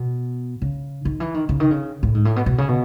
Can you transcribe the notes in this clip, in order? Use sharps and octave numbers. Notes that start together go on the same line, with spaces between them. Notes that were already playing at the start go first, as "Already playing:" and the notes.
Already playing: B2
C#3
D#3
E3
D#3
C#3
D#3
C#3
A2
G#2
A2
B2
B2
C#3
B2